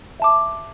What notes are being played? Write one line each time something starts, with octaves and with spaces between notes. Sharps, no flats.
E5 A5 D6